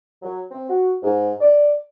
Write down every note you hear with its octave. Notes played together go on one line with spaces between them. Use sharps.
F#3
C4
F#4
G#2
D5